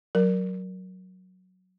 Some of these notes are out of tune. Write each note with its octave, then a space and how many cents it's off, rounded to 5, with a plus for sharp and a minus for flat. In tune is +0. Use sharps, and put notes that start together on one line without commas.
F#3 +0 A#4 +0